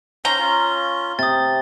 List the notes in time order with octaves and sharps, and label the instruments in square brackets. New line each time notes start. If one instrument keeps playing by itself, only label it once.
[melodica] C#4 C5 [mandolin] A#5 [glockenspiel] G7
[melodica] C#4 F4
[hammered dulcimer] C3 [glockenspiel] D#6 A6